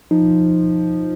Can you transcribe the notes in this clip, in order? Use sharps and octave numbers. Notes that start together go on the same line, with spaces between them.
F3 D#4